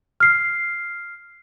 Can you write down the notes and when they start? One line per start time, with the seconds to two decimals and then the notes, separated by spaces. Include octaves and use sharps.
0.20 F6 C7